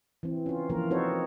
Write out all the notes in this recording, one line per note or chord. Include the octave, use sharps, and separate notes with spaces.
E3 C4
C#4 F4
E3 F3 A#3 F4 A#4
C4 D#4 F#4 A4 C5 C#5